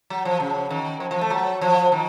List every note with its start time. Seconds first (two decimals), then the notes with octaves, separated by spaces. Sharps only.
0.10 F#3
0.25 F3
0.40 C#3
0.71 D#3
1.00 F3
1.11 F3
1.21 A3
1.30 F#3
1.61 F3
1.92 D#3